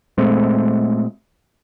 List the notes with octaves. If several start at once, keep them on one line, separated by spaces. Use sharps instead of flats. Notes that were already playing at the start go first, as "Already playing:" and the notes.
A#2 G#3 A3 C4